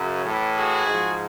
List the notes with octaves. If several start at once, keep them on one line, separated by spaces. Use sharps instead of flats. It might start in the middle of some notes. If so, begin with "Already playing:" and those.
Already playing: F#2 C#3 F#3
A2 E3
F#4 G#4
G#2 F3